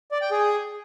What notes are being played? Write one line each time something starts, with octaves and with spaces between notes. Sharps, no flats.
D5
G5
G#4